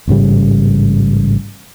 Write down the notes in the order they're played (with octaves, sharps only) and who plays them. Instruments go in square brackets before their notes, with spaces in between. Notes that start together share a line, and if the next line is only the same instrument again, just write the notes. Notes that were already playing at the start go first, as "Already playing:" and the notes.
[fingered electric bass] A1 G#2 C#3 G3